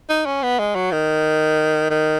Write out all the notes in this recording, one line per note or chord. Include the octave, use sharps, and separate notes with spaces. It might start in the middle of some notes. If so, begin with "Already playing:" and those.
D#4
C#4
B3
G#3
F#3
D#3
D#3